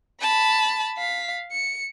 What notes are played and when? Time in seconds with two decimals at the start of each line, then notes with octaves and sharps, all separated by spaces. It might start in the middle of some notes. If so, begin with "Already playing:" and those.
0.21 A5 B5
0.97 F5 B6
1.52 C#7